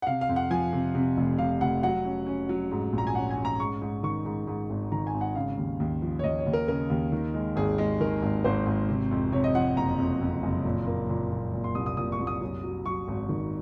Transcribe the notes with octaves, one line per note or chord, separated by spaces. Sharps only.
F#5
C3 F5
F5
F2
F#5
F3 G#5
C3
C3
F1
C3 F5
F1 F#5
F#3 F#5
C#4
C#4
F#3
G#2
A#1
A#5
G#5
C#4 F#5
G#5
C#4
A#5
G#2 C#6
G#2
D#3 C#6
G#2
G#2
G#1
D#3 A#5
G#5
G#1
F#5
C#3 F5
D#2
D#2
F3
C#5
D#2 D#5
C#5
D#2
A#4
C#3 A#4
D#2
D#3
G#3
G#1 G#4
G#3
D#3 A#4
G#1
G#1 C5
G#1
C3
F2
C3 C#5
D#5
F3 F#5
F#1 A#5
F2
F2
F#1
A#2
A#3
A#2
A#2
A#2
C6
C2 D#6
D#6
A#2 D#6
C#6
C2
D#6
F#2
F#3
F#3 C#6
G#1
D#3